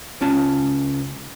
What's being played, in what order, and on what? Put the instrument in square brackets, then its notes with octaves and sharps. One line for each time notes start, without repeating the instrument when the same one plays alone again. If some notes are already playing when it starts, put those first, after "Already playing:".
[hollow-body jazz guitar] C#2 C#3 C#4 F4 A5